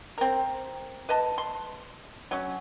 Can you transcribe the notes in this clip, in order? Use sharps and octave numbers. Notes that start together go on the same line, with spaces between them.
C4 A#4
B4 D#5 A5
C6
F#3 C#4